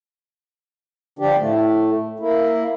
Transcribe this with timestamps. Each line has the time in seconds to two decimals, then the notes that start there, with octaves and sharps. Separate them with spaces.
1.19 D3 F3 D4 G4
1.38 A2 A3
2.20 A#3 E4